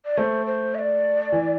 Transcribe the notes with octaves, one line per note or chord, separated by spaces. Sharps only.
D5
A3 C5
C5
E5
D5
E3